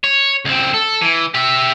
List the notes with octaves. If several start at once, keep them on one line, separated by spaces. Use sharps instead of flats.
C#5
C#2 C4
A4
E3
G4 E5